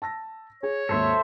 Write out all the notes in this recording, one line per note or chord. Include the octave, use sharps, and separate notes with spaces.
A5 E6 A#6
G#4 C#5
G#1 D#2 A4 C5 E5